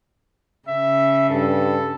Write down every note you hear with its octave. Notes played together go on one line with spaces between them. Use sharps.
C#3 E5
G2 A4